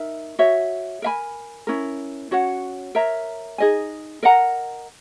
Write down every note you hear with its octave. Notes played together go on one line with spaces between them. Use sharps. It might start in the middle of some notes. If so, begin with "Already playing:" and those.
Already playing: D#4 A#4 E5
F#4 C#5 E5
A#4 E5 G#5 B5
C#4 E4 A#4
C#4 F#4 C#5 F#5
A#4 C#5 E5 A#5
D#4 G#4 D#5 G#5
A#4 D#5 F#5 A#5